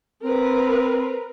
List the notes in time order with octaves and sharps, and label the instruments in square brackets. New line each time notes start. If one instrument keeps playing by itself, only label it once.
[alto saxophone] C4 [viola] A#4 B4